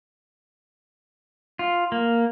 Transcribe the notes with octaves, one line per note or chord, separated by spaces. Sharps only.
F4
A#3